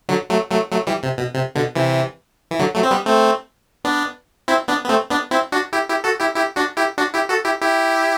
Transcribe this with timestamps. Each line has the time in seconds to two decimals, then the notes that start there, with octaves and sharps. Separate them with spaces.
0.09 D3 F#3
0.30 F#3 A3
0.51 F#3 A3
0.71 F#3 A3
0.87 E3 G3
1.03 C3
1.18 B2
1.34 C3
1.55 B2 D3
1.76 C3 E3
2.51 E3
2.59 D3 F#3
2.75 F#3 A3
2.83 C4
2.91 G3 B3
3.06 A3 C4
3.84 B3 D4
4.48 C4 E4
4.68 B3 D4
4.84 B3
4.89 A3 C4
5.10 B3 D4
5.31 C4 E4
5.52 D4 F#4
5.73 E4 G4
5.88 E4 G4
6.04 F#4 A4
6.20 E4 G4
6.35 E4 G4
6.56 D4 F#4
6.77 E4 G4
6.98 D4 F#4
7.14 E4 G4
7.29 F#4 A4
7.45 E4 G4
7.61 E4 G4